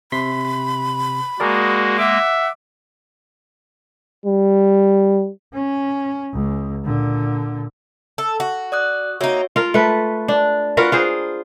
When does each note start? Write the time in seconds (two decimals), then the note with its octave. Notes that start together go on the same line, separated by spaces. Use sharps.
0.12 C3 B5 C6 B6
1.40 G#3 A#3 F#4 G#4 A#4 D5
1.99 E5 F#5 D6
4.25 G3
5.54 C#4
6.33 C#2
6.85 A#2 D3
8.18 A4
8.40 F#4
8.72 D5 D#6 F#6
9.21 A#3 D#4 F#4 C#5 E5
9.56 F4 A#4
9.74 A3 B4
10.28 D4
10.77 F4 F#4 A#4 B4
10.92 F4 G#4 C5